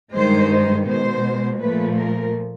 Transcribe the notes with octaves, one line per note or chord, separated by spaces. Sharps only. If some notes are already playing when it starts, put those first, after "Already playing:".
G2 D#3 G#3 C5
C5
B2 G#3 C5
A#2 F3 A3 B4
A#4